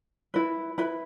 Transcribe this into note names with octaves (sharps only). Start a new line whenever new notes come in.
E4 B4
E4 B4 B5